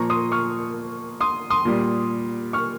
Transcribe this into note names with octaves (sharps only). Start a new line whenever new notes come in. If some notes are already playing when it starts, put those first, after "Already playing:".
Already playing: A#2 F3 A#5 C#6
C6 D#6
C#6 F6
C6 D#6
C6 D#6
A#2 G3
C#6 F6